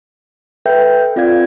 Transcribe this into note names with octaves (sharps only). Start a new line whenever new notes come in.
A4 B4 E5 G5 G6
C4 F4 D5 F5 G#6